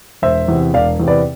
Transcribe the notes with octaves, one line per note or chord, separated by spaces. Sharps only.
E1 C5 E5
E2 C3
E1 D5 F5
E2 C3
B4 D5